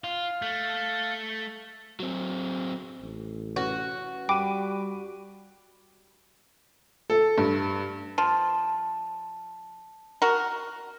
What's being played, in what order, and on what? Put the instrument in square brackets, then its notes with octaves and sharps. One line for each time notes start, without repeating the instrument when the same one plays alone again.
[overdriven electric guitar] F4 [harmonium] F5
[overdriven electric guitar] A3
F#3 C4
[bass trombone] A1
[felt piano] C#4 B4 [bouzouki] F#4
[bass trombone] G3 [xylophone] G5 D6 [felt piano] B5 D7 D#7
[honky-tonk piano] A4
G2
[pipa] F3 [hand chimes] A5
[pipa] F#4 A#4